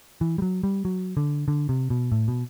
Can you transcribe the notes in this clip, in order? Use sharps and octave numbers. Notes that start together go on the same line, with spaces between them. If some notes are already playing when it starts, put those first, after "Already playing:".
E3
G3
F#3
G3
F#3
D3
D3
C3
B2
A2
B2